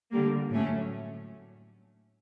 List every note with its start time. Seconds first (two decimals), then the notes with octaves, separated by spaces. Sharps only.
0.11 D3 G3 A#3
0.51 A2 F#3 A3 C#4